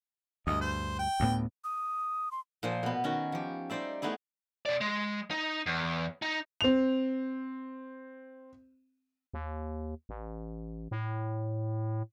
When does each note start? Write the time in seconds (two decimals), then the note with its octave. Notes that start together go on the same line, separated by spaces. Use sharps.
0.47 D2 G2 D#5
0.61 C5
0.99 G5
1.20 D2 A2 B3
1.64 D#6
2.31 C6
2.63 A#2 F3 C5
2.83 B2 B3
3.04 D#3 C#4 F#4
3.32 F3 G4
3.70 G3 D#4 C5 D5 E5
4.02 A3 B3 D#4 E4 G#4
4.66 B2 D5
4.81 G#3
5.31 D#4
5.66 E2
6.22 D#4
6.61 C4 F7
9.34 D#2
10.09 A1
10.91 A2